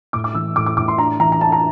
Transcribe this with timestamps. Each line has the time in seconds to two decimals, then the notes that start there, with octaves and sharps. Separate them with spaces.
0.13 A2 D6
0.24 D6
0.35 E3 E6
0.56 A2 D6
0.66 D6
0.77 A2 D6
0.88 C6
0.98 D4 A#5
1.20 E3 A#5
1.32 A#5
1.41 D4 A5
1.52 A#5